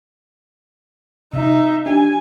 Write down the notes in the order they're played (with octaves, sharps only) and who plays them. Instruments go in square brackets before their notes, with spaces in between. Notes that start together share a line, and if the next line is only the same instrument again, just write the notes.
[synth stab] C3 [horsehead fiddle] D#4 E5
[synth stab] D4 G4 [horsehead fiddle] G#5